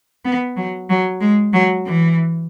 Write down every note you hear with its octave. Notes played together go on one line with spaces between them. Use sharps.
B3
F#3
F#3
G#3
F#3
E3